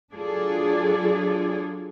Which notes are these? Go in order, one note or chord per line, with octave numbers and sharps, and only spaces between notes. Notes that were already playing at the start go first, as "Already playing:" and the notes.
F#3 D4 F4 G#4 A4 D5